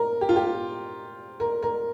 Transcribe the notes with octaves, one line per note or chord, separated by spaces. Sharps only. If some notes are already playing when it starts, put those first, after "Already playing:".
Already playing: A#4
G4
F4
G4
A#4
A#4